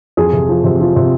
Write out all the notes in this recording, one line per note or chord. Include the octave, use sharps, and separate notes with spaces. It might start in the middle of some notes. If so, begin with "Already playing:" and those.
F2 G#4
C3
F3
C3
F3
C3